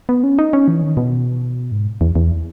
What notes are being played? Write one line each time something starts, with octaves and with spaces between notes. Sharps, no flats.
B3
C#4
D#4
C#4
E3
D#3
B2
G#2
E2
E2